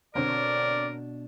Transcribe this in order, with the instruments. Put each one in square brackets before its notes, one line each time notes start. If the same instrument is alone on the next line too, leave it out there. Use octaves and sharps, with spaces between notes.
[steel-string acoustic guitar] B2 D4 [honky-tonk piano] D3 C4 C#5 [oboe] A#4 [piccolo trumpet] D5